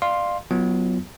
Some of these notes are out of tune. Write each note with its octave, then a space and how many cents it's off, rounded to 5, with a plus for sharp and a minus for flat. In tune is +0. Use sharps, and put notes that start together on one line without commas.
D5 +35 F5 +0 C6 +10
F#3 +0 B3 +0 F4 -25